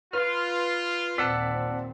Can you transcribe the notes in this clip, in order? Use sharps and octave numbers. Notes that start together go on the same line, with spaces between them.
F4 B4 F6
D#2 A#2 C4 D5 F#5 A5 E6 B6